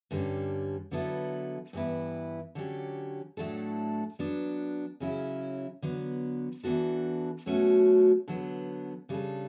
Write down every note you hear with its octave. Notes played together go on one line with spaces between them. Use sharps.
G2 D3 G3 C#4
D3 F#3 B3 E4 A4
G2 E3 B3 E4 B4
D3 F#3 C#4 G4
A2 F#3 A3 D4 A4
F#3 B3 D4
C#3 F#3 C#4 E4
D3 F#3 B3
E3 B3 D4 F#4 A4
B2 F#3 A3 C#4 F#4
D3 F#3 B3
C#3 G3 D4 A4